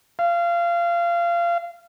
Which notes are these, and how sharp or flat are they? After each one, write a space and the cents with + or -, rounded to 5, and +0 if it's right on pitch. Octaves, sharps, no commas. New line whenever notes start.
F5 -25